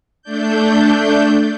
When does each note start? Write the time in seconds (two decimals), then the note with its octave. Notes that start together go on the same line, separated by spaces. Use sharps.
0.22 A3 D4 G6